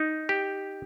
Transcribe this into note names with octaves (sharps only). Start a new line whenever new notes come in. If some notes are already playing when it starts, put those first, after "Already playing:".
Already playing: D#4
G4